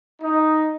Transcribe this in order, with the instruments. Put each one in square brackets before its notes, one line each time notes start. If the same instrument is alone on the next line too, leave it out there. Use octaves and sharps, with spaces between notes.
[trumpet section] D#4